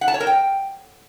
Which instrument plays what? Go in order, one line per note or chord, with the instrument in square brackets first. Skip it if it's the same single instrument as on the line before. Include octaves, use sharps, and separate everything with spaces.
[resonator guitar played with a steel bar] F#5
A5
C#5
A#4
G5